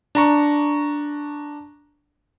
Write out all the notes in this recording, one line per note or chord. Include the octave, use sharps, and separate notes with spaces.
D4 A#5 C#6